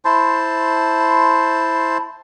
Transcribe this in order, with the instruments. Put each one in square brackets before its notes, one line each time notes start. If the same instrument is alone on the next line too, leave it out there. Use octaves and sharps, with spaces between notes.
[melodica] E4 C5 A5 C6